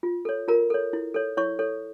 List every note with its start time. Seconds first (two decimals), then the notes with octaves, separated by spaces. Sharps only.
0.03 F4
0.25 A4 C#5
0.48 F4 A#4 A#5
0.70 A4 C#5
0.93 E4
1.14 A4 C#5
1.37 E4 C#5 C#6
1.59 A4 C#5